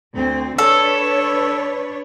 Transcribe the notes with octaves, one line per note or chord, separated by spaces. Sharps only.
D2 C4
D4 A4 B4 C#5